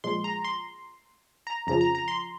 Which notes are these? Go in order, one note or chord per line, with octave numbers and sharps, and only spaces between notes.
A#2 F3 G#3 C6
A#5
C6
A#5
F2 C#3 F3 A#5
A#5
A#5
C6